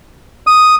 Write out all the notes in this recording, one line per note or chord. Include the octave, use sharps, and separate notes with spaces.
D#6